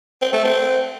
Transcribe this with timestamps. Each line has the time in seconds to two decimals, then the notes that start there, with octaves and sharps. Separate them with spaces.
0.22 C4
0.33 A3
0.44 C4